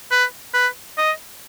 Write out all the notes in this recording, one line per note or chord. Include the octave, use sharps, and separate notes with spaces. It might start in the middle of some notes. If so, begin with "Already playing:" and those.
B4
B4
D#5